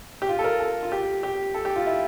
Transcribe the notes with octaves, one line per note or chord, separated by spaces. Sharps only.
G4
F4
A4
A#4
A4
F4
G4
G4
A4
G4
F4
E4